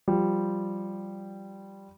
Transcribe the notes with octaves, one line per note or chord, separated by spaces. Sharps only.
F3 G3